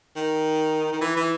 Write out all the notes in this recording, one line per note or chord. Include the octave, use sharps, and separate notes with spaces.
D#3
D#3
E3
E3